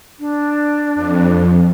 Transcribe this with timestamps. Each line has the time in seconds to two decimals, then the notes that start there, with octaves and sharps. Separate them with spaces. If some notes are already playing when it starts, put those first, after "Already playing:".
0.20 D4
0.95 F2